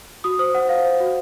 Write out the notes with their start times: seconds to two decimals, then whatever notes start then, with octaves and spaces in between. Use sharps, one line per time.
0.24 F#4 D#6
0.39 C5 D#6
0.55 C5 F#5
0.69 C5 F5
0.85 C5
1.00 F#4